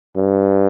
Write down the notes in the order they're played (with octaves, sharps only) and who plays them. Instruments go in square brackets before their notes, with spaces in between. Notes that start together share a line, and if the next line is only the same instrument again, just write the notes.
[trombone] G2